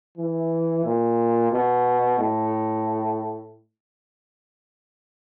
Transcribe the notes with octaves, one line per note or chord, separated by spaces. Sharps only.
E3
A#2
B2
A2